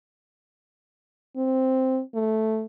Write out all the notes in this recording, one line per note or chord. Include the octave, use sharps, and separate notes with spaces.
C4
A3